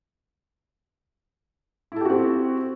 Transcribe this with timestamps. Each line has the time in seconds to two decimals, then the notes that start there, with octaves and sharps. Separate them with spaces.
1.92 E4
1.96 A4
2.01 G4
2.05 F#4
2.10 C4